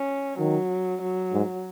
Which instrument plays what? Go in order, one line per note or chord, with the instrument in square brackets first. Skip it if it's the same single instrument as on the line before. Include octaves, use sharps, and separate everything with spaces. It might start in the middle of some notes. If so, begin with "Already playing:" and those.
Already playing: [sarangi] C#4
[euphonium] D#3 [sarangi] F#3
[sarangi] F#3
[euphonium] G#2